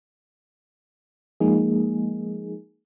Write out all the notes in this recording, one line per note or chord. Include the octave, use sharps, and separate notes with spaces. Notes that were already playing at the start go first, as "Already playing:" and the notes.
F3 G#3 A#3 D#4 G#4